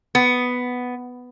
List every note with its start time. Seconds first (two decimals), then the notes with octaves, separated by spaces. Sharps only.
0.15 B3